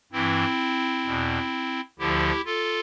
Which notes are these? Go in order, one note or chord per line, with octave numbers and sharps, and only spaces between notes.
G2 E3 C4 E4
E2 B2
D2 D3 F3 E4 G4
F4 A4